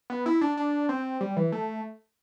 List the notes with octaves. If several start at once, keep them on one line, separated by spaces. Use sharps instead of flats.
B3
E4
D4
D4
C4
G3
E3
A3